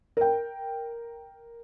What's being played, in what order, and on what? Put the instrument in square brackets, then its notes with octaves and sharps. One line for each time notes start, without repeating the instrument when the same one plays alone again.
[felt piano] A#4 G5